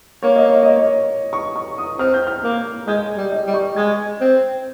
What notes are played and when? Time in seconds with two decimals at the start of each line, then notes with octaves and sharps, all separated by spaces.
0.23 A#3 C#5
0.36 D#5
0.50 C#5
0.63 D#5
0.76 C#5
1.33 C#6
1.56 C#6
1.78 D#6
1.99 C4 F6
2.14 G6
2.27 F6
2.44 A#3
2.87 G#3 G6
3.17 G3
3.32 D#5
3.47 G3
3.54 C#6
3.76 G#3 G#6
4.21 C4